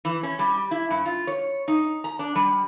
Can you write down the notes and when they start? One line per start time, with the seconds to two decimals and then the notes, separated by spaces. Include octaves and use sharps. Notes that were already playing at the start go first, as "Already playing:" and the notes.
0.05 E3
0.23 C#4
0.39 G3
0.71 E4
0.90 G2
1.05 F4
1.27 C#5
1.68 D#4
2.04 A#5
2.19 D4
2.35 G3